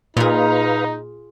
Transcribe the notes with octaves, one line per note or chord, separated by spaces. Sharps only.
A#2 D#4 F4 G#4 B4 F5 A#5